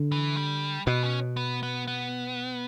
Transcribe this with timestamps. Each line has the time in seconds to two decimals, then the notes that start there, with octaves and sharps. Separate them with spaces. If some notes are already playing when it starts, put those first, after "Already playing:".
Already playing: D3
0.12 E3
0.36 G3
0.87 B2 B3
1.03 C#4
1.37 B3
1.63 B3
1.87 B3